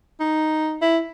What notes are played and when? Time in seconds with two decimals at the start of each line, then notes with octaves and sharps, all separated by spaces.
0.20 D#4
0.81 E4